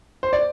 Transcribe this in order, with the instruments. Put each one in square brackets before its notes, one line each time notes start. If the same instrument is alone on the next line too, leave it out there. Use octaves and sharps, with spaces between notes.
[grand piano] C5
D5